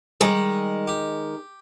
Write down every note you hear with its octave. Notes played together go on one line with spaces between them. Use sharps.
D#3 G3 G#3
G4